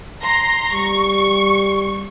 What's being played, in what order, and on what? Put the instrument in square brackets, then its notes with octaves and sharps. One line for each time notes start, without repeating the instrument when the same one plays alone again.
[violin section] A#5 C6 A#6
[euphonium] G3 [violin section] C#6